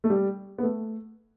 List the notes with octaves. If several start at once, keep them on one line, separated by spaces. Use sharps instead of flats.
A3
G3
B3
A3